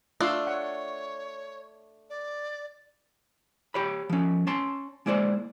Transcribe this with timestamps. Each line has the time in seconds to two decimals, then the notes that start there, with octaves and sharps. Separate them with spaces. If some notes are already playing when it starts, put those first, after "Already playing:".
0.20 A3 D4 F4 C6 E6
0.47 C#5 F#5
2.10 D5
3.74 G4 C#5 B5
4.09 F3 C#4
4.47 C#4 A5 C6
5.06 G#3 A#3 E4 C5 D5